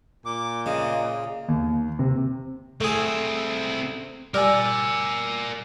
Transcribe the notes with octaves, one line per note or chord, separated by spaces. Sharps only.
A#2 D6
C#3 D#5
D#2
C3
A3 C4 E4 G#4
G3 A#4 D5 G#5 E6 F6